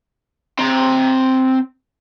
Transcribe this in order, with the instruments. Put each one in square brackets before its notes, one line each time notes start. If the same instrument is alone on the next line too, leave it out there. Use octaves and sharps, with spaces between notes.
[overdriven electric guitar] C4 A#5